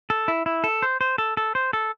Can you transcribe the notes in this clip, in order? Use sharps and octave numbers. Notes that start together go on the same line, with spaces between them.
A4
E4
E4
A4
C5
C5
A4
A4
C5
A4